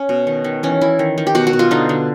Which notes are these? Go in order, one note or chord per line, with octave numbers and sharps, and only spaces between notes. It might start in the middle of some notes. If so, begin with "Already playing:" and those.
Already playing: C#4
B2
D#3
D#3
E3 C#4
E3 E4
D#3
D#3
G4
B2 F#4
F#4
B2
F4
D3 D#4
D3